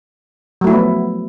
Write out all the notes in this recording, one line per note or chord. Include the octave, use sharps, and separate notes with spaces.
F3 F#3 A3 B3 E4